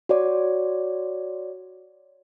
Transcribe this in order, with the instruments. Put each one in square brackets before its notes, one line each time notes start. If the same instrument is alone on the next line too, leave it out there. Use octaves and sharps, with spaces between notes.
[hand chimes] F#4 C#5 D5